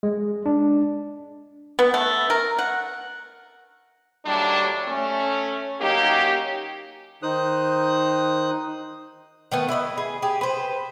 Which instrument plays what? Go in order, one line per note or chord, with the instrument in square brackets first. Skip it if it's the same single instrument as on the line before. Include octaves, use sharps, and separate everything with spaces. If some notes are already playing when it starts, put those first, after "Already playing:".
[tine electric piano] G#3
D4
[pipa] B3
A3
A#4
F#5
[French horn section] D#2 A2 F#3 G3 D4
A3 C#4
F#3 A#3 C#4 D#4 G4
[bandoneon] D#3 D#4 C5 D#6 F#6
[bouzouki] D#3 A3 B3
E4 B4 D5 D#5
G#4
G4 G#4
B4 C5